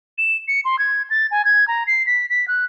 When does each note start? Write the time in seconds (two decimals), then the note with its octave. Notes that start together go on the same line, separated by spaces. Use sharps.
0.18 E7
0.48 C#7
0.65 C6
0.79 G#6
1.10 A6
1.31 G#5
1.45 G#6
1.68 A#5
1.87 C7
2.06 B6
2.30 B6
2.48 F#6